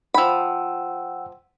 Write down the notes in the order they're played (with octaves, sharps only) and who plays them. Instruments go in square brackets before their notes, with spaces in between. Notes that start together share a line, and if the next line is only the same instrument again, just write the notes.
[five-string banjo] F3 B5 [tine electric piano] F#5 G5 E6